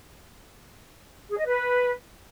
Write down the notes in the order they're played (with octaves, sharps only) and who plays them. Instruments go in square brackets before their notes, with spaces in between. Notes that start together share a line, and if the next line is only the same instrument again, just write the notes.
[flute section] G#4
D#5
B4